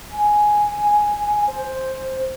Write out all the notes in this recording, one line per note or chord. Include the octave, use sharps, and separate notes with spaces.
G#5
C5